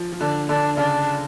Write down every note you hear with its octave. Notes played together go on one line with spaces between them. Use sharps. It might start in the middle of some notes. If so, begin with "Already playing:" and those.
Already playing: F3
F3
D3 D4
D3 D4
C#3 D4